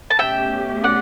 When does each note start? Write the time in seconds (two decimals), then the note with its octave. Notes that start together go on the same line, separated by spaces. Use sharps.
0.10 A5
0.19 B2 A3 C#4 G4 E5 G5
0.84 D5 F#5